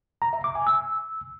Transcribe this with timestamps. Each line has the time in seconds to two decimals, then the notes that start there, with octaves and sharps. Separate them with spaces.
0.22 A#5
0.33 E5
0.44 D6
0.55 G#5
0.67 E6